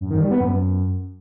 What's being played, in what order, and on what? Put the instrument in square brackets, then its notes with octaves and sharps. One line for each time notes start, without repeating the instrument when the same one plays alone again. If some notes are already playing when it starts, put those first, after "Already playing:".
[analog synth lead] F#2
D#3
G3
B3
F#2